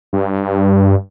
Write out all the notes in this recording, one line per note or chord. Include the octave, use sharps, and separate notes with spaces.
G2